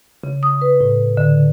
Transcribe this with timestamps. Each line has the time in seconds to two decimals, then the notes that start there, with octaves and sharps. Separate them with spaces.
0.24 C#3
0.43 D#6
0.61 B4
0.81 A2
1.17 D3